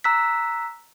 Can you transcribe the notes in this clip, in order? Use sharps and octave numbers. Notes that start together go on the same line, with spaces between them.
A#5 E6 F#6 B6